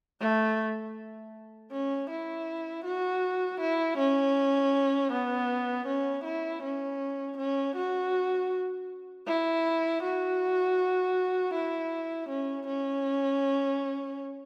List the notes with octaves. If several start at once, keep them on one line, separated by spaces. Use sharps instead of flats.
A3
C#4
E4
F#4
E4
C#4
B3
C#4
E4
C#4
C#4
F#4
E4
F#4
E4
C#4
C#4